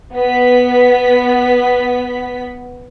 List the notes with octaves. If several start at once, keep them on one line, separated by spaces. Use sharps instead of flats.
B3 B6